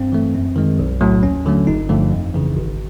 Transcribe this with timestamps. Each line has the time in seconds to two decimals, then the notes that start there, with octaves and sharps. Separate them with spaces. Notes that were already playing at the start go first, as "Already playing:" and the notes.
Already playing: G2 C4
0.12 E3 A3
0.35 F#2
0.56 D#3 G#3
0.79 B1
1.01 A2 F#3 A3
1.23 D#2 C#4
1.46 D3 F#3 A3
1.67 G1 D#4
1.89 G2 D3 F3 A3
2.12 F2
2.34 C#3 E3
2.57 G#1